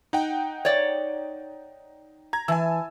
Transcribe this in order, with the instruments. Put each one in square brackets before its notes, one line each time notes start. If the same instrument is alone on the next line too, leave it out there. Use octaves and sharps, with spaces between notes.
[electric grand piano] D#4 F#5 G5
[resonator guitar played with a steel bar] C#5 D5
[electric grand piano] A#5 G#6
[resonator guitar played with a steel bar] E3 [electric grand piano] G#5 A5 E6